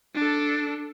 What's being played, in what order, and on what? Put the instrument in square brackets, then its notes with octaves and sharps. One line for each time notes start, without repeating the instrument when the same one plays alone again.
[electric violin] D4 A4